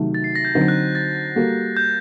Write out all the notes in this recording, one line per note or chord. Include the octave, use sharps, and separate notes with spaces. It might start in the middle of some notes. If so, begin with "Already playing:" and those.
Already playing: C3 D#3 F#3 A3
A6
C7
A#6
G6
D3 F#3 C4 D#4
F#6
A6
G3 A#3 F#4 A4
G6